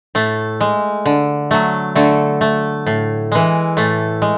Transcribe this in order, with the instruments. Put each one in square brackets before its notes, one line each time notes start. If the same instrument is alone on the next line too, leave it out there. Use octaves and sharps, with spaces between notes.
[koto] A2 A3
G#3
D3
F#3 A3
D3 A3
A3
A2
E3 G#3
A2 A3
G#3